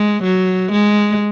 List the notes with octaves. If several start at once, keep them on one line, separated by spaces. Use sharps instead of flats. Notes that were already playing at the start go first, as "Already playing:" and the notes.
Already playing: G#3
F#3
G#3